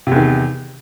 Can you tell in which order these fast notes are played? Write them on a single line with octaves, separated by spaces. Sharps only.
C3 E2 D#3